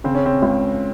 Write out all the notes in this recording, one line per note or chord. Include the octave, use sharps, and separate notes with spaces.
C#3 C4
C#4
C4
C#2